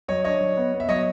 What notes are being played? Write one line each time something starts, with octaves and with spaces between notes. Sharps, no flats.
F#3 C#5 D#5
D4 C#5 D#5
F#3
B3
B3
E5
F#3 C#5 D#5